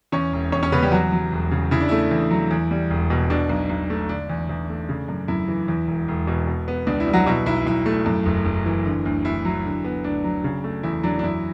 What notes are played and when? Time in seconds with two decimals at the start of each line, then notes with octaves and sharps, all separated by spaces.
0.12 E2 C#4 C#5
0.33 E1
0.52 E1 C#4 C#5
0.63 C#4 C#5
0.72 C#3 B3 B4
0.82 G3 G4
0.92 E2 F#3 F#4
1.12 F#3
1.32 E1
1.51 C#3
1.71 C#3 E4
1.81 D4
1.89 A3 E4
2.11 E2
2.31 F#3
2.51 E2
2.71 G3
2.90 E1
3.10 B2
3.30 B2 D4
3.49 B1
3.69 B1
3.90 A3
4.09 D3 D4
4.30 E2
4.49 E2
4.70 A3
4.89 C#3
5.08 F#2
5.28 F#2 E4
5.48 E3
5.68 E2
5.88 E1
6.08 E1
6.27 B2
6.47 B2
6.68 B3
6.87 C#2 D4
7.00 E4
7.07 G3
7.13 F#3 F#4
7.26 B2 E4
7.46 B1 E4
7.66 B1 E4
7.86 A3
8.06 F#2
8.26 F#1
8.46 F#1
8.66 E3
8.85 D3
9.06 D2
9.25 D2 E4
9.45 F#3
9.64 D3
9.85 B3
10.04 D2 D4
10.24 F#3
10.44 C#3
10.64 A3
10.83 E2 E4
11.03 F#3 D4
11.19 D4
11.23 F#2 E4